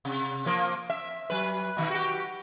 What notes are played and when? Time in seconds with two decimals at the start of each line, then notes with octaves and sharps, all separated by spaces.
0.05 C3
0.46 F3 A#3
0.90 E5
1.30 F#3 B4
1.77 B2 D#3
1.90 F#4 G4